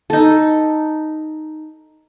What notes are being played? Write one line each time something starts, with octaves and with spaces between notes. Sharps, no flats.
D#4 A4